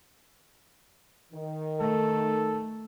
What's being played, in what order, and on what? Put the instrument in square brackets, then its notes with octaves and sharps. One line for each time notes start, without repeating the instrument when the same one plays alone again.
[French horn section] D#3
[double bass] A3 [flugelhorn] A4